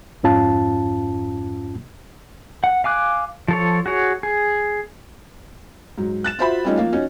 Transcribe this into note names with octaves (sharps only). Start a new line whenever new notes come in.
F2 G#2 C#4 F4 A5
F#5
F5 G#5 D6 F#6
F3 A4 C#5
F#4 G#4 C#5
G#4
G#2 F#3
F#6 A6 E7
F4 F#4 C5 E5 B5
G3 A3 C#4 D#4 F4
F3 A#3 F5
C#4 D#4 F#4